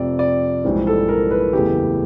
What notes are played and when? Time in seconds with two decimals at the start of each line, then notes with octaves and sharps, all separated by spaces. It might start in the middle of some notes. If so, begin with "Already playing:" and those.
Already playing: F1 F2 C3 D5
0.19 D5
0.64 A#1 G#2 E3 G3 C4
0.87 A4
1.09 A#4
1.31 B4
1.53 F#1 E2 C#3 E3 A3 G4